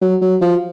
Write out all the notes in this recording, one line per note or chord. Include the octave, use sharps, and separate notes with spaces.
F#3
F#3
F3